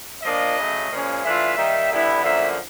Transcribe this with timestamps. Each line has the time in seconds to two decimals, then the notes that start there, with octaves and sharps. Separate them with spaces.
0.23 A#2 F3 A#3 D4 F4 D#5
0.57 C#3 F#3 A3
0.90 A#2 F3 G#3 C#4
1.23 E3 A3 D4 F4 E5
1.57 D#3 G3 A#3 D#4
1.90 D3 G3 B3 E4
2.23 F#2 D3 F3 A#3 E5